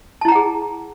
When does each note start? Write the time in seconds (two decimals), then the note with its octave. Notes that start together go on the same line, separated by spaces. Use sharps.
0.21 A5
0.25 E4
0.28 A#5
0.32 F#5
0.35 G#4